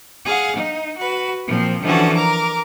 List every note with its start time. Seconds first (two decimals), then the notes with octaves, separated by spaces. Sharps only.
0.24 G#4 F5 F#5
0.57 D#4
0.98 F#4 B4
1.48 A#2 F3 C4
1.82 D3 E3 F3 C#4 F#4 A4
2.15 A#4 A#5 D6